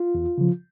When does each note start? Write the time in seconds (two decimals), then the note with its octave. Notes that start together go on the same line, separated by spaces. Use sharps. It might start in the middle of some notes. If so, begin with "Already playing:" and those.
Already playing: F4
0.15 E2
0.38 C#3 F3